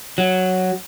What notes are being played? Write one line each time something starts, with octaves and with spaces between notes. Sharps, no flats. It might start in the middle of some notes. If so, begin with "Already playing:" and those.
F#3